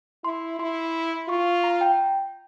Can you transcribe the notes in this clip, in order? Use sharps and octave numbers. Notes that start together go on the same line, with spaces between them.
E4 C6
E4 C6
F4 C#6
A#5
G5